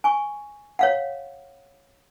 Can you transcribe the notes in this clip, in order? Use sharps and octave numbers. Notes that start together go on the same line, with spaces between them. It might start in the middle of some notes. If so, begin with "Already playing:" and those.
G#5 C#6
C#5 F5 F#5